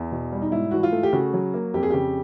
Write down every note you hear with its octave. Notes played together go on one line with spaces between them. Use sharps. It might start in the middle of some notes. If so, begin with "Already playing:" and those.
Already playing: E2
B2
G3
D#4
G#2 E4
E3 F#4
F4
A3
G4
C#3 F#4
F#3
A#3
F2 G4
G#4
C#3 G4